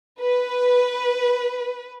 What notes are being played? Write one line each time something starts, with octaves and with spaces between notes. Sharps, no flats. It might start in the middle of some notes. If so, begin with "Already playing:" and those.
B4